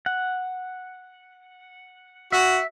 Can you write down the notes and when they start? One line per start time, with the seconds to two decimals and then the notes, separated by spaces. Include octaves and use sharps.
0.06 F#5
2.32 F#4 E5